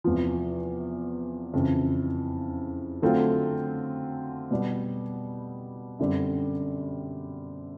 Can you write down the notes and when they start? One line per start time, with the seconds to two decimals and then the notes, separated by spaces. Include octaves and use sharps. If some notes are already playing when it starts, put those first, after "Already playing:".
0.04 E2 C3 F3
1.53 F2 C#3 E3
3.02 D3 F#3 A3 C4 F4
4.51 B2 G3 B3
5.99 F#2 D3 G3 C4